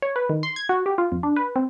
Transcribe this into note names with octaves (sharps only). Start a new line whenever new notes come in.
C#5
B4
D#3
C6
G#6
F#4
G4
F4
F2
D4
B4
C4